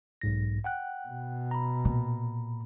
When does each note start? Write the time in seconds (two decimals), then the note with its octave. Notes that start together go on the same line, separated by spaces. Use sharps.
0.21 B1 G#2 A#6
0.64 F#5 G5 F#6
1.08 B2
1.51 A#5 B5
1.85 A#2